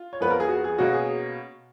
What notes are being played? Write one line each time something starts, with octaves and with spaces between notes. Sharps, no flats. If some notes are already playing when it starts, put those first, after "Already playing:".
Already playing: F4
C#5
F2 F3 B3 B4
A#4
G#4
F#4
G#4
B2 A#3 C#4 F#4
G#4